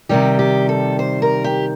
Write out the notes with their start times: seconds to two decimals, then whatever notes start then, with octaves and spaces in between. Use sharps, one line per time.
0.09 C3 D#3 G3 G4
0.39 G4
0.69 A4
0.99 C5
1.22 A#4
1.44 G4